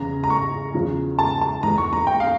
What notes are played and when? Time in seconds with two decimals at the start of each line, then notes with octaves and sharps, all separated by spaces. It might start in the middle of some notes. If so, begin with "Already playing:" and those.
Already playing: E2 C#3 E3 A#5
0.24 A#5
0.30 C#6
0.74 E2 C#3 F3
1.19 A5
1.41 A5
1.63 E2 E3 A#5
1.78 C#6
1.93 A#5
2.07 G5
2.20 F5